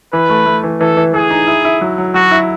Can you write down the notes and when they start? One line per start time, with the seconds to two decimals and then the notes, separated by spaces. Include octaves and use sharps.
0.13 E3 B4
0.29 A3
0.46 A3
0.64 E3
0.80 E3 A4
0.97 E3
1.14 E3 G#4
1.30 D#4
1.47 E4
1.65 E4
1.81 F#3
1.98 F#3
2.14 F#3 F#4
2.31 E4